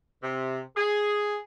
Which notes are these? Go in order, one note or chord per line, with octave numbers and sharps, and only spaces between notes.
C3
G#4